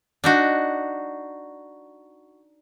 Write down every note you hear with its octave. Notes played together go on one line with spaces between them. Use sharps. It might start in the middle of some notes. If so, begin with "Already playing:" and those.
D4 D#4 F#4